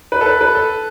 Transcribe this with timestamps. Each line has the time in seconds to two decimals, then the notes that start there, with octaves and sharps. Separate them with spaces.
0.12 B4
0.21 A4
0.26 B4
0.41 B4
0.55 A4